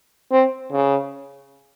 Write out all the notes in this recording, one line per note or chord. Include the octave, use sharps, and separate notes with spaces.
C4
C#3